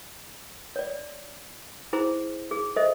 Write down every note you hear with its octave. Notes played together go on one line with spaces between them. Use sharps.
C#5 D5
E4 G#4 C5 A#5
G#4
A4 C5 D#5 E5